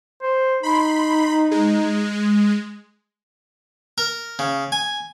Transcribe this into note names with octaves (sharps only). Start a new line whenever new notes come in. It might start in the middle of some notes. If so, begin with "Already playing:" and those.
C5
D#4 B5 C6
G#3
A#4
C#3
G#5